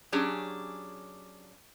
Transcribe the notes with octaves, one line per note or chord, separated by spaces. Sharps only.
F#3 C#4 D4 G4 G#4